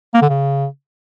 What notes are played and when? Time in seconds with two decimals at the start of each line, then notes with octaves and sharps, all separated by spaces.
0.14 A#3
0.22 D3
0.29 C#3